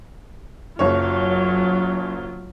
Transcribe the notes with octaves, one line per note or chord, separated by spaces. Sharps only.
F#1 F#3 F4 C#5